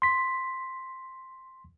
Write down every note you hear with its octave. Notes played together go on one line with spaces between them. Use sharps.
C6 B6